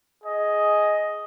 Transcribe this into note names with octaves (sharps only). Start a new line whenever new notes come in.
G#4 D#5